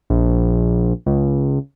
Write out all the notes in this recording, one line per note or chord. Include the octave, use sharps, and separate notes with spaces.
A#1
C#2